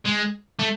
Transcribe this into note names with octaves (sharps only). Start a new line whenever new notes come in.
G#3
A3